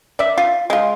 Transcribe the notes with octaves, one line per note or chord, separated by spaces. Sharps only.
D5 E5
F4
G#3 F4